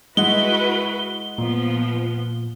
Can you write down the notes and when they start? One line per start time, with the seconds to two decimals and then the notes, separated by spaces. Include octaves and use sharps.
0.17 G#3 E4 F#4 B4 D#5 F#5 G7
1.38 A#2 F3 B3